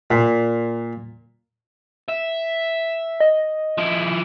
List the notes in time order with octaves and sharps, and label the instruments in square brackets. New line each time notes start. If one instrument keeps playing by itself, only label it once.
[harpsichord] A#2
[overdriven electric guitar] E5
[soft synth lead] D#5
[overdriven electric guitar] F3 E4